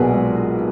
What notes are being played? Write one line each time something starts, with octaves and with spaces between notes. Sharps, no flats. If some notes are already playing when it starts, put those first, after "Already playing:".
Already playing: B1 A#2 B3 F#4 G#4 A#4 B4
G#3